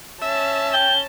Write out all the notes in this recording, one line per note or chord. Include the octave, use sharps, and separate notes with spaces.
C#4 E5 A5
G5 G7